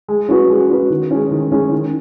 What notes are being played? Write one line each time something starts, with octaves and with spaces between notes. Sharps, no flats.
G#3
C#4 F#4 B4
G#3
C#4 F#4 B4
D#3
G#3 C#4
D#3
G#3 C#4
D#3